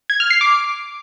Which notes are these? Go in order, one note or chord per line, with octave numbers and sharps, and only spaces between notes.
G#6
F6
C7
D6